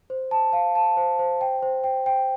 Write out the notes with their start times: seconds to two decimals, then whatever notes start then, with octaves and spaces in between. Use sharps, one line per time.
0.10 C5
0.31 A5
0.53 F5
0.75 A5
0.97 C5
1.19 C5
1.41 G5
1.62 C5
1.84 G5
2.06 G5